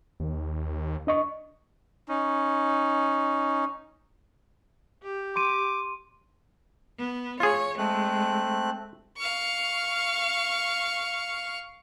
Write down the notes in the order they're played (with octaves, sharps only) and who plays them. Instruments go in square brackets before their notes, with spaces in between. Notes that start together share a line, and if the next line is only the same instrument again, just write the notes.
[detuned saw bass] D#2
[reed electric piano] D4 D#5 C#6
[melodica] C#4 D#4
[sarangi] G4
[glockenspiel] C6 D#7 [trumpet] D6
[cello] B3
[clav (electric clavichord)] F4 G#4 [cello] C#5
[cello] G#3 [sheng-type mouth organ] A3 C4 F#6
[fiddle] F5 C#6